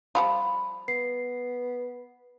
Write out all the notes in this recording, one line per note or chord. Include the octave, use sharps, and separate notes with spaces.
F3 G3 F4 B5
B3 C7